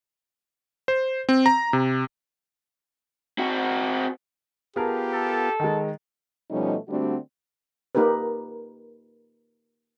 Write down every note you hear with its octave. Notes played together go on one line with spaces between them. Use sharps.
C5
C4
A#5
C3
C4 F#4
B3 F4 G4 G#4 A#4 A5
A4
D#3 G#3
B2 F3 G3 A3 C#4 D#4
D3 G3 A3 C4 D4 F#4
A#3 D#4 G4 A#4 B4